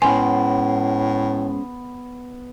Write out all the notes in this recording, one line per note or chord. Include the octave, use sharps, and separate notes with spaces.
A2 G#3 B3 C#4 C5 G#5